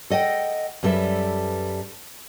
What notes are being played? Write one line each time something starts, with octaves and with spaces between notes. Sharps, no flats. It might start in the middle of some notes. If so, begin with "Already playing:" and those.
A4 D#5 F#5 G5
F#2 G3 A4 B4 E5